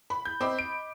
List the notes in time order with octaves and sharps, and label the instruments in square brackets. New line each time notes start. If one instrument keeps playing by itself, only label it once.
[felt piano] B5
[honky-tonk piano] G6
[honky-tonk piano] C4 [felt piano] D#5 B5 D6
[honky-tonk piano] D7